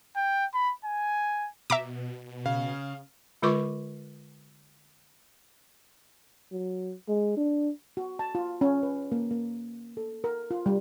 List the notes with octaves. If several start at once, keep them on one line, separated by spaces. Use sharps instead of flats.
G5
B5
G#5
B2 E5 A#5 D6
C#3 F5
D3 G#3 F4 B4 C#6 D6
F#3
G#3
D4
F#4
A5
F4
C#4
B4
A#3
A#3
A4
A#4
F4
G3